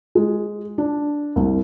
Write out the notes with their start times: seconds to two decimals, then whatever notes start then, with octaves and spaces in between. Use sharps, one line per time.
0.15 G#3
0.78 D4
1.36 C2